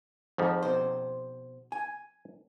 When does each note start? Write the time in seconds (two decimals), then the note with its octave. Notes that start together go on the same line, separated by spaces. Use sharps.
0.38 F2 G#2 F3
0.63 B2 C5
1.72 G#5